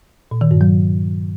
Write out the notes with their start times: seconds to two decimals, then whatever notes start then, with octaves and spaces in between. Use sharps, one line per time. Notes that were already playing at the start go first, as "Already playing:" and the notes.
0.31 A#2
0.41 D#3
0.51 G2
0.61 F#3